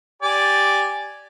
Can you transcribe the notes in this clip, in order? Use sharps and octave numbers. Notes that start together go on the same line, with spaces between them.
G4 D5 G#5